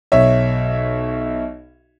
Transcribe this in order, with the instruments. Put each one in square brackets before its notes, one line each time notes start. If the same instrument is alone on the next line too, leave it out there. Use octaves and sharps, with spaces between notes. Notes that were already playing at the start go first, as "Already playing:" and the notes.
[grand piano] B1 C#5 E5